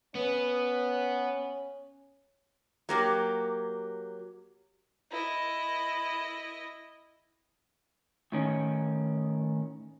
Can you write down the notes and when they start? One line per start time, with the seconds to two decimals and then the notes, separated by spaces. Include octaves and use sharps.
0.15 B3 C#4
2.89 F#3 A#3 G4
5.11 E4 D#5
8.32 A2 D#3 C#4